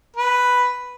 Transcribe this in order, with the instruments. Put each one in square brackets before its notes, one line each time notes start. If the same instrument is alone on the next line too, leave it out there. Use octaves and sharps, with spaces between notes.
[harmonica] B4